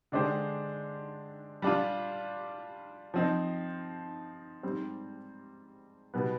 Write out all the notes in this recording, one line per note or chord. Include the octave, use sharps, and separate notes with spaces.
D3 G#3 D4 G4 C5
G3 D4 F4
F3 C4 D#4
G#2 G3 C4
B2 G3 B3